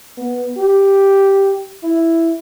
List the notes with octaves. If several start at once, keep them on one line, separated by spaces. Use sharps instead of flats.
B3
G4
E4